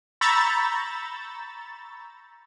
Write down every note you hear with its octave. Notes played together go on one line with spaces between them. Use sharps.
A#5 B5 C#6 E6 G6 A6